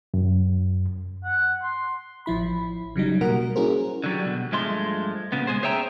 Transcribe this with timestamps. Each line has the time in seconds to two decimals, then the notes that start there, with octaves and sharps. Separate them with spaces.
0.14 F#2
1.24 F#5
1.62 C6
2.26 A1 F3 E4 B5
2.96 C#3 F#3 G3 D#4
3.21 B2 G3 A#3 F#4 A#4 F#5
3.55 C#4 E4 F#4 G#4 A#4 C5
4.04 D3 F#3 G3
4.25 B2
4.52 G2 F3 G#3 A3 C6
5.32 A#2 C#3 B3
5.47 G#3 B3 G#4 C5
5.63 G#4 C5 C#5 E5 G5 A#5